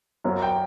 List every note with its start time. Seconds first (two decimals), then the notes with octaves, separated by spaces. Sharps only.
0.24 F#2 F#3 A#3
0.42 G5